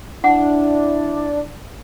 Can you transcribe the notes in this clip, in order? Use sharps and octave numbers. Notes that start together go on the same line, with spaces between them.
D4 E4 F#5